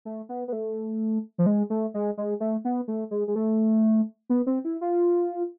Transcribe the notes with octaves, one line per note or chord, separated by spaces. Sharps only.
A3
B3
B3
A3
F3
G#3
A3
G#3
G#3
A3
B3
A3
G#3
G#3
A3
B3
C4
E4
F4